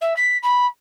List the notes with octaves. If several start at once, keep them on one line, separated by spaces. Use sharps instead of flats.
E5
B6
B5